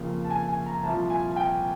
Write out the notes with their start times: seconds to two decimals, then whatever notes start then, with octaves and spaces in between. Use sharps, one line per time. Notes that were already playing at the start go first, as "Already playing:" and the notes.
Already playing: F2 C#3 F3 A#3
0.25 A5
0.30 G#5
0.48 G#5
0.66 A#5
0.84 C2 A#2 F3 A5
1.10 G#5
1.36 G5